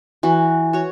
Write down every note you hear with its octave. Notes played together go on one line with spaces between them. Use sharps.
E3 F#4
F#4 C#5